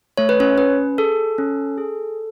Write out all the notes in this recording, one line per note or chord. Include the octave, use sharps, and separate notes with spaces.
A3 C#5
B4
C#4 C#5
C#4 B4
G#4 A4
C#4
G#4